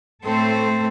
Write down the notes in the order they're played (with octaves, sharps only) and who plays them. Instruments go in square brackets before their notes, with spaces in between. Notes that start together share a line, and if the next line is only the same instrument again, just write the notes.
[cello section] A2 A3 A4 [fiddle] C4 C5